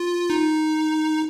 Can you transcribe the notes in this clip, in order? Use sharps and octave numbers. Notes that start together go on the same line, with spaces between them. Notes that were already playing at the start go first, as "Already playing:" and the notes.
Already playing: F4
D#4